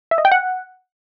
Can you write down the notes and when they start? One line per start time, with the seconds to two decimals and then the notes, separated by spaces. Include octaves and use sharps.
0.11 E5
0.18 D#5
0.25 G5
0.32 F#5